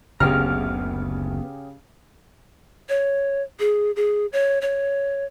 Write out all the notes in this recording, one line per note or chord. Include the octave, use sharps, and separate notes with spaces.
F#1 D2 C#3 B3 G4 G#4 A#5 F6
C#5
G#4
G#4
C#5
C#5